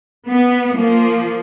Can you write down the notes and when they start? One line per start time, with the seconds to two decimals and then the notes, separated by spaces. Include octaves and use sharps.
0.27 B3
0.73 F3 A#3